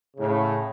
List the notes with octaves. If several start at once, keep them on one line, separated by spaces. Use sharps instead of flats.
A2 C#3